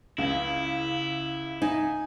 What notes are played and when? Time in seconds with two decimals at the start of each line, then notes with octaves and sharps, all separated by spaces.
0.18 C#2 C#3 E4
1.62 D#4 G#5